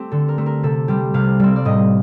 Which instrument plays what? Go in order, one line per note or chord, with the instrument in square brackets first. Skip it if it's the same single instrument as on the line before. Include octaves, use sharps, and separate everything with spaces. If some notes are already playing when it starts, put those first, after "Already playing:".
Already playing: [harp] A3 C4 G4
D3 A4
A#4
A3 C4
A#4
C3 A4
G3 C4 G4
C3 F5
G3 C4
D5
A2 D#5